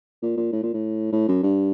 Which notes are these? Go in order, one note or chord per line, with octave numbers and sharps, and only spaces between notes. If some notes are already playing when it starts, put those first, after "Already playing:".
A#2
A#2
A2
A#2
A2
A2
F#2
G2